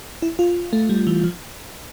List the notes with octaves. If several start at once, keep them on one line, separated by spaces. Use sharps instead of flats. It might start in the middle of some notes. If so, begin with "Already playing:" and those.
E4
F4
A3
G3
E3
F3